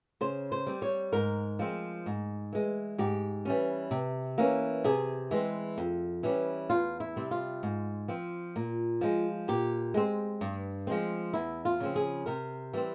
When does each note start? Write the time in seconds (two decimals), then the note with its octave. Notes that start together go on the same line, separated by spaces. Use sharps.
0.21 C#3 C5
0.52 C5
0.67 G3 C4
0.82 C#5
1.13 G#2 A#4
1.59 F3 G#3 C4
2.06 G#2
2.53 E3 G#3
2.98 G#2 G4
3.45 E3 G3 C#4
3.91 C3
4.38 E3 A#3 C#4
4.84 C3 G#4
5.31 E3 G#3 C4
5.78 F2
6.23 E3 G3 C#4
6.70 E2 F4
7.00 E4
7.16 C3 G3 C4
7.31 F4
7.63 G#2
8.08 F3 C4
8.56 A#2
9.01 F3 G#3
9.48 A#2 G4
9.94 G#3 C4
10.41 G2
10.87 F3 G#3 C4
11.33 E2 E4
11.65 F4
11.80 C#3 F3 C4
11.96 G#4
12.26 C3 A#4
12.73 E3 G3 C4